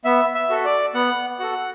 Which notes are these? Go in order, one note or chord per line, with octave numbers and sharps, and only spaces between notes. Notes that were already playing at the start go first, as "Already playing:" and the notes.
B3 E5
E5
F#4 A4
D5
B3 F#5
F#4 A4 F#5